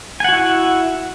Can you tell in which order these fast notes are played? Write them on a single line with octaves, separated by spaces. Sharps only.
G#5 F#5 F#4 E4